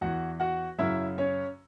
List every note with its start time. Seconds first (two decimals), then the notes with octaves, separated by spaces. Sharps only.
0.01 E2 E3 F#4 F#5
0.40 F#4 F#5
0.78 F#2 C#3 F#3 E4 E5
1.18 C#4 C#5